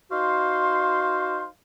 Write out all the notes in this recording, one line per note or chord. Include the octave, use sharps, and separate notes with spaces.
D#4 F#4 C5 F5 C6